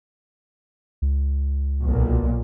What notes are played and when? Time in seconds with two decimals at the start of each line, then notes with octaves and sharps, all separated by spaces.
1.02 C#2
1.84 B1 A#2